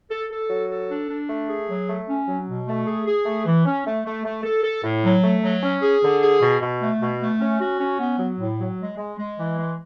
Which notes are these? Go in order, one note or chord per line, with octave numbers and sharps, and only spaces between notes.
A4
A4
F#3
A4
D4
D4
A3
G#4
F#3
A3
C#4
F#3
B2
A3
G#4
G#4
A3
E3
C#4
A3
A3
A3
A4
A4
A2
F#3
A3
F#3
C#4
G#4
D3
G#4
B2
B2
A3
B2
A3
C#4
F#4
C#4
B3
F#3
A2
F#3
G#3
G#3
G#3
E3
G#3